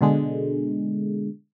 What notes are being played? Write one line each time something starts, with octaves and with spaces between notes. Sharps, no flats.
B2 D3 G#3